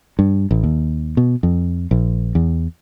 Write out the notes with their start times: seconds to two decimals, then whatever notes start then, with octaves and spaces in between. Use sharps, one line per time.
0.19 G2
0.51 A1
0.64 D#2
1.17 B2
1.43 F2
1.91 A#1
2.35 E2